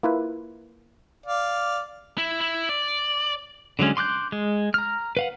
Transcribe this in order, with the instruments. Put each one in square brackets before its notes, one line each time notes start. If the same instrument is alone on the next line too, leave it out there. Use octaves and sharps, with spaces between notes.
[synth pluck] A#3 E4 F4 B4
[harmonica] D5 F5
[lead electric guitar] E4
E4
D5
[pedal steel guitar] D3 F#3 G#3 C#4
C6 D6 F#6 G6
G#3
A#5 F6
B4 F5 F#5